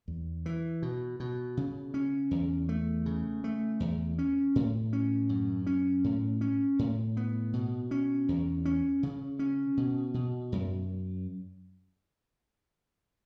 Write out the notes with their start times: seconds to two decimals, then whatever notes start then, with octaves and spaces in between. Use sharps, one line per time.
0.08 E2
0.46 E3
0.82 B2
1.20 B2
1.57 C#3
1.94 C#4
2.31 E2
2.69 A3
3.06 C#3
3.44 A3
3.80 E2
4.18 C#4
4.55 A2
4.93 C#4
5.29 F#2
5.67 C#4
6.04 A2
6.41 C#4
6.79 A2
7.17 B3
7.53 B2
7.91 C#4
8.28 E2
8.65 C#4
9.03 C#3
9.39 C#4
9.77 B2
10.14 B2
10.52 F#2